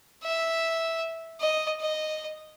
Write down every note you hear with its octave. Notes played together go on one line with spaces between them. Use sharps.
E5
D#5
D#5